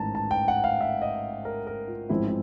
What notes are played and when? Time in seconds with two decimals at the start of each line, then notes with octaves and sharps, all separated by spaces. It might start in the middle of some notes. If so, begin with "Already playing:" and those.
Already playing: A1 G#2 D#3 A5 A#5
0.15 A5
0.31 G5
0.48 F#5
0.64 F5
0.81 E5
1.02 D#5
1.45 A#4
1.67 A#4
1.88 F4
2.09 A1 G#2 F3 G#3 C4 E4
2.27 E4